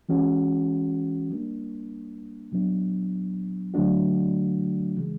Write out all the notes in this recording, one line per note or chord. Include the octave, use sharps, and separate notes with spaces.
E3 G#3 C#4 F#4
G3 A#3 D4
A#2 F#3 B3 D4
D3 F#3 A3 D4 F#4
C#3 E3 G#3